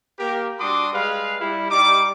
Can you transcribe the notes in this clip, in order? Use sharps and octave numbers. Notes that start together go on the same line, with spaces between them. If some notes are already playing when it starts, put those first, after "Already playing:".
A#3 G4 A#4
G3 D4 F#4 C6 D6 D#6
G3 G#3 G#4 B4 F5
G3 E4
G3 D#4 D6